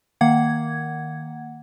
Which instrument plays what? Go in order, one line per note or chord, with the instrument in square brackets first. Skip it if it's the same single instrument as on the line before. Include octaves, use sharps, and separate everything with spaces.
[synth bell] D#3 A#3 F#5 G#6